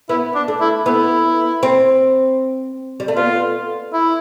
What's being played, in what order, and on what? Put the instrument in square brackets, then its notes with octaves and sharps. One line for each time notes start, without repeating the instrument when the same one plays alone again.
[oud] B3 [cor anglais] E4
[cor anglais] D4
[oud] A3
[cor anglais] E4
[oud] B3 [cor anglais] E4
[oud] C4
G3
A3
[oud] B3 [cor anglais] F4
[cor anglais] E4